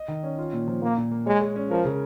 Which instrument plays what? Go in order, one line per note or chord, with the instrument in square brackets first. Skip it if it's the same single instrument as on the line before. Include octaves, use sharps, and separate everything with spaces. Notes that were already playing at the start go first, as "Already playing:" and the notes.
Already playing: [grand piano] D#5
D#3
C#4
F4
A#2
F3
[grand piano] A#2 [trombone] A#3
[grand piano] A#2
A#3
[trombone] G#3 [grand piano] C#5
[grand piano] G#3
C#4
[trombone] F3 [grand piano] A#4
[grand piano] C#3